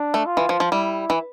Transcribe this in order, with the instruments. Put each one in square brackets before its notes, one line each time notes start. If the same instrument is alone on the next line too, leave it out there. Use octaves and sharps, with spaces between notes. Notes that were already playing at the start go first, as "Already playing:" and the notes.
Already playing: [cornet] D4
[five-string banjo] A3
[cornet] F4
[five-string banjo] E3
F3
F3
[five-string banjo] G3 [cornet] E4
[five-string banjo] E3